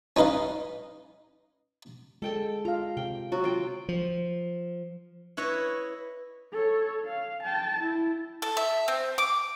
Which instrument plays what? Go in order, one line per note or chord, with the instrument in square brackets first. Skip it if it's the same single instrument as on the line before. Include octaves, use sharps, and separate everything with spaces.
[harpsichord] C#4 D#4 B4 D#5 F5
[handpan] G#3 [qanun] A4 G5 A5
[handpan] F4 F5 [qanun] A#5
[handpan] C3 [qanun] G5
[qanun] F#3 F#4
F4 G5
[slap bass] F3
[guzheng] E4 B4 C#5 D#5
[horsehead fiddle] A4 C#5
F5
G5 A5
E4
[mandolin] A4
E5
C4
D6